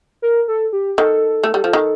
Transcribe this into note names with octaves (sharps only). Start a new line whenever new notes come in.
A#4
A4
G4
D#3 A4
A3
G3
F3
D#3